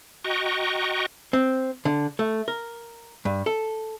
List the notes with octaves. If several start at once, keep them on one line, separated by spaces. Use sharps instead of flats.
F#4 D#5 G5 A#5 C#6
C4
D3
A3
A#4
G2
A4